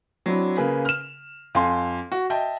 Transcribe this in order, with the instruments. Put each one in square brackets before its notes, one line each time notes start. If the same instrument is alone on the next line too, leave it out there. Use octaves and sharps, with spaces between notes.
[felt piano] F#3 C4 D4 E4
C#3 A#3 G#4 B4
F6 E7
F2 F5 G#5 C6
F#4
D#5 E5 G5 A5